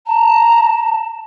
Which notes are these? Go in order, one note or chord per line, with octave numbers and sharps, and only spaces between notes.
A5 A#5